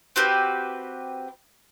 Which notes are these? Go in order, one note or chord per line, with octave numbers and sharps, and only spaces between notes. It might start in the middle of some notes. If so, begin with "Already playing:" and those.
C4 F#4 G4 B4